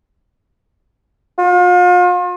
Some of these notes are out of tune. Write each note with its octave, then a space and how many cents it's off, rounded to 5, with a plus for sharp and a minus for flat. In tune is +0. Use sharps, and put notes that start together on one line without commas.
F4 +40